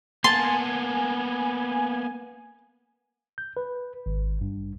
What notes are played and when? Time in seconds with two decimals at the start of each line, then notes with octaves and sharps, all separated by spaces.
0.24 A#3 B3 G#5 A5 C6
3.38 G6
3.57 B4
4.06 G#1
4.41 G2